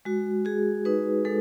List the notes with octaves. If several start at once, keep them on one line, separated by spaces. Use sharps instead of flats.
G#3 F#4
F#4 G#4
D#4 B4
G#3 A4